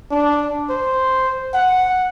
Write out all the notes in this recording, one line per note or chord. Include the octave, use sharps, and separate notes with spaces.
D4
C5
F#5